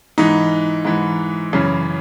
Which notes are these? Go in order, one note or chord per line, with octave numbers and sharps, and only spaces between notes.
G#2 E3 D#4
G#2 E3
F#2 C#3 E3